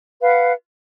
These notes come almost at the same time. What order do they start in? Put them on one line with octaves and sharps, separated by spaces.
B4 F5 F#5